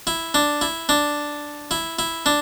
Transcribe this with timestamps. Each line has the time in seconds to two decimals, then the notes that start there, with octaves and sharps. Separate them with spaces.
0.07 E4
0.34 D4
0.61 E4
0.89 D4
1.71 E4
1.99 E4
2.26 D4